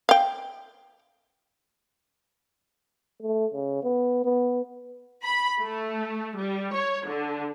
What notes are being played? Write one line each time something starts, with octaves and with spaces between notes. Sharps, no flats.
F5 G5
A3
C#3
B3
B3
B5
A3
G3
C#5
D3